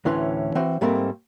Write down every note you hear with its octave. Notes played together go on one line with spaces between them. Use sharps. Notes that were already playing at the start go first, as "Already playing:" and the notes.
D2 A2 E3 C#4 B4 C6
E3 C4 F#4 C5
G#2 G3 A3 A#3 C4